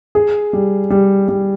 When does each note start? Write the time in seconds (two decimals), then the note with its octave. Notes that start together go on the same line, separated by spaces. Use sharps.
0.15 G#4
0.53 G3
0.90 G3
1.28 G3